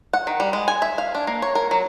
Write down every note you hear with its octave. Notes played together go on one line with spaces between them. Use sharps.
F#5
D#3
G3
G#3
G#5
E5
F5
D4
A#3
C#5
A#4
F#3